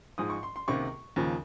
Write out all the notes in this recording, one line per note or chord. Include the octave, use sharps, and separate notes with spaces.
G#2 F3 G#3 D#6
C#6
C6
C6
C#2 C3 D#3 A#3 C#6
D#2 C#3 F3